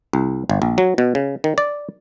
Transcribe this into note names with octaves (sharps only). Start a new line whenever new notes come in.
C2
G1
A#1
F#3
B2
C#3
D#3
D5